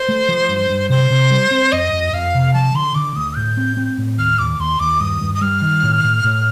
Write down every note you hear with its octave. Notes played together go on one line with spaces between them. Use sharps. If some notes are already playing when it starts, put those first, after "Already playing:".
Already playing: C5
A3
F3
G2
G2
C3 C5
C3
G3
C4
F2 D#5
F2
F2 F5
C3
F3 A5
D3 C6
D3 D6
D2 D#6
A2 G6
C4
C4
A2
D#2 F6
D#2 D6
D#2 C6
D#2 D6
G2 D#6
G2
D#6
G3 F6
D#3
A2
A2
A2